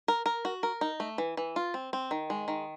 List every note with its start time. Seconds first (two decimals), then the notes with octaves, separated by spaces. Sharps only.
0.08 A#4
0.26 A#4
0.45 F#4
0.63 A#4
0.81 D#4
1.00 A3
1.18 E3
1.37 E3
1.56 F4
1.74 C4
1.93 C4
2.11 D#3
2.30 G#3
2.48 D#3